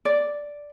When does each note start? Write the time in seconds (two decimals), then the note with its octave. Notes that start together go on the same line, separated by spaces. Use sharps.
0.05 D5